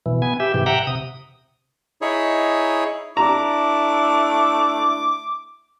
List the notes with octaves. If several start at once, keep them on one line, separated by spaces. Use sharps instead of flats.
B2 E3
B3 G#5
G4 E5
G#2 C3 E3 G4
E5 F#5 G5 A#5
C3 D#6
D#4 E4 G#4 C#5
A3 D4 E4 A#5 D6